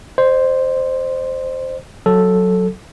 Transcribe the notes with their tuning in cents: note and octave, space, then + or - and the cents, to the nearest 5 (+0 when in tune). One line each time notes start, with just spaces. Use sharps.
C5 +0 D#5 -45
F#3 +0 A4 +0